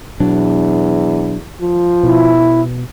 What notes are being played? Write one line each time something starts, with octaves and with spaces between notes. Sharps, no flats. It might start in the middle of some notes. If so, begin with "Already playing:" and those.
E2 B2 F#3 D4
F3
B2 E4